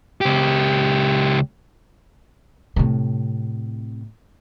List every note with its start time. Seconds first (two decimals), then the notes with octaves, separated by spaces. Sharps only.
0.21 C#2 G4
2.76 A2 C3